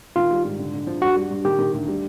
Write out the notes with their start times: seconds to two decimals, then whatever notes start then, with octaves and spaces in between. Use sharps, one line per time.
0.16 D#3 F4
0.31 G3
0.45 G#2
0.59 D3
0.74 D3
0.87 F3
1.02 G2 F#4
1.16 G3
1.30 G2
1.45 D#3 G4
1.59 D#3
1.74 D2
1.88 G3